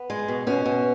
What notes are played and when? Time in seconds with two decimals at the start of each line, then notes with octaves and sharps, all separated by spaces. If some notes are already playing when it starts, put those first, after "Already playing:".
Already playing: B3
0.10 G#3
0.28 B2
0.47 B2 C#4
0.66 B2